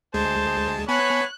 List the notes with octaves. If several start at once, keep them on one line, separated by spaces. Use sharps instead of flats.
D2 G#3 G#4 C5 A5
B3 C#5 G#5 A5 B5 F#6